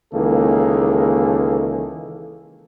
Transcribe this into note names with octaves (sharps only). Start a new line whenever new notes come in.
C#2 D#3 E3 A#3 G#4 A4